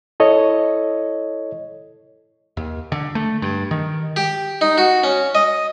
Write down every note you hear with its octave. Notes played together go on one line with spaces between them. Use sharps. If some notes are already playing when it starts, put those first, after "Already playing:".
E4 A4 C#5 D#5
D#2
D3
A3
G2
D#3
G4
D#4
F#4
C#4
D#5